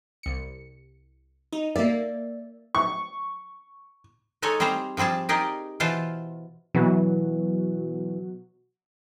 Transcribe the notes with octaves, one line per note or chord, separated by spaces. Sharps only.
C2 C#7
D#4
A#3 D5 E5
C#6
G#3 D#4 A4 C#5 G#5
G3 C4 G#4 C5 A#5
F3 G3 C4 G#4 A5
D#4 G4 G#4 A#4 D5 D#5
B2 E3 F4 C5 F5 A5
B2 E3 F#3 F#4